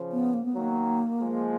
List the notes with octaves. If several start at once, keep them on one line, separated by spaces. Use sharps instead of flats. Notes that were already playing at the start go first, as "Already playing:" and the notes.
Already playing: C#3 F3
B3
A#3
B3
D#3 F#3 A#3
F3 G#3